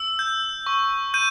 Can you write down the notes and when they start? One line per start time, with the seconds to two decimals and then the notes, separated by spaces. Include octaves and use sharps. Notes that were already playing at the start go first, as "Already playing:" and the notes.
Already playing: E6
0.19 G6
0.66 C#6
1.14 G6 D#7